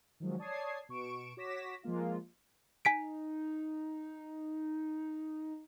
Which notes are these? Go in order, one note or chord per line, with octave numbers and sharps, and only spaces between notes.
D#3 F3 F#3 G#3
C#5 D5 A5 D#6 G#6 C7
B2 C#6 D7 E7
F#4 C#5 D6 A#6 B6 E7
F3 G#3 A#3 F4
D#4 G#5 B6 D7